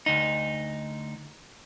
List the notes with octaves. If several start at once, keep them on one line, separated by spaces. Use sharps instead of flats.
D2 D#4